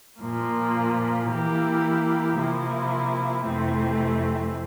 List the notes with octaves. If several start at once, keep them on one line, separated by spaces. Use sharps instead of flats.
A#2 F3 A#3
E3 A#3 E4 G4
C3 F3 A#3 E4
F2 C3 E3 A3 C4